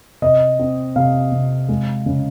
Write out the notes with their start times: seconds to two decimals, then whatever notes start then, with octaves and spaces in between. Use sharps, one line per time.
0.22 C3 D#5
0.59 C4
0.96 C3 F5
1.32 C3
1.69 G#3
2.06 C#3